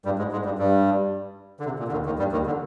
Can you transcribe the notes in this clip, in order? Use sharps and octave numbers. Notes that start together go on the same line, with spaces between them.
G2 G3
G#2 G#3
G#2 G#3
G2 G3
G2 G3
D3
C3
A#2
D3
D#2 D#3
D#2 D#3
G2 G3
D#2 D#3
D3